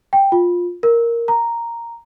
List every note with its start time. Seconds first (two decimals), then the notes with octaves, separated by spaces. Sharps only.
0.13 G5
0.32 F4
0.83 A#4
1.28 A#5